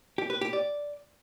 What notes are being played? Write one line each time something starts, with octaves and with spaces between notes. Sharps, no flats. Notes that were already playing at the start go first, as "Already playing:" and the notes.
G4
B4
G4
D5